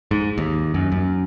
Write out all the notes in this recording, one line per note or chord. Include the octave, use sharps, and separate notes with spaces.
G#2
D#2
F#2
F#2